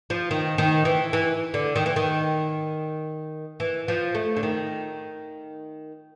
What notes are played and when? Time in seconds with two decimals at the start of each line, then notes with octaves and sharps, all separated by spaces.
0.10 F3
0.31 D#3
0.58 D#3
0.85 E3
1.13 E3
1.54 D3
1.76 D#3
1.86 E3
1.96 D#3
3.60 E3
3.88 F3
4.15 A3
4.37 D3
4.43 D#3